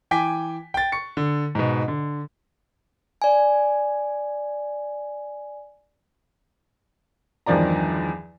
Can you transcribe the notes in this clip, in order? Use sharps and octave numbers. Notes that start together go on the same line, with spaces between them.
E3 G5 G#5 D6 B6
G5 A6
C#6 C#7
D3
G#2 B2
D3
D5 G#5
E2 G2 D#3 F3 D5 A#5